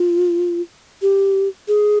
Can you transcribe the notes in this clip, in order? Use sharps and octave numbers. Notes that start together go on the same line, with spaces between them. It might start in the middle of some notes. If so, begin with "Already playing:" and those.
Already playing: F4
G4
G#4